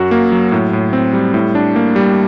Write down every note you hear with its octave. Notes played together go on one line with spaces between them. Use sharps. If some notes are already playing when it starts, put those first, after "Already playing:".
Already playing: F#2 F#4
A#3
F#3
A2
A2
C4
G3
A2
D4
A#3
G3